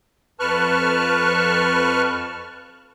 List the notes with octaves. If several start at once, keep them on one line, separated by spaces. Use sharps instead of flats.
F2 B4 A5 C#6 F6 F#6